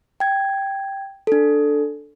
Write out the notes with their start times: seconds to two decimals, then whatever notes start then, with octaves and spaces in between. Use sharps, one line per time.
0.20 G5 G#6
1.27 D4 A4